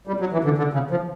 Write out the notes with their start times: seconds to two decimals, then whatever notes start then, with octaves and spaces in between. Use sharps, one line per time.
0.07 G3
0.20 F#3
0.33 E3
0.44 D3
0.58 D3
0.73 C#3
0.91 F3